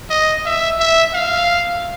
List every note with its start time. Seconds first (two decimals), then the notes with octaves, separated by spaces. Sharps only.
0.10 D#5
0.45 E5
0.79 E5
1.14 F5